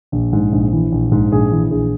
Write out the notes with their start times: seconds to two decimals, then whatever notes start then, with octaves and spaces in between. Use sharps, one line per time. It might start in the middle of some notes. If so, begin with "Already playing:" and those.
0.12 A#1
0.33 G#2
0.52 A#1
0.73 E3
0.92 A#1
1.12 G#2
1.32 A#1 G#4
1.52 E3
1.71 A#1 G#4